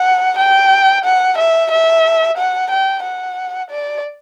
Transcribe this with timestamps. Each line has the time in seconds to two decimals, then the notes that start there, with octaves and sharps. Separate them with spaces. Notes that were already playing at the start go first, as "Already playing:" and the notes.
Already playing: F#5
0.39 G5
1.05 F#5
1.38 E5
1.71 E5
2.38 F#5
2.71 G5
3.03 F#5
3.71 D5